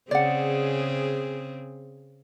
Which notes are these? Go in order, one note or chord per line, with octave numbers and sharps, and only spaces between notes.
C#3 C4 G#4 D5 F#5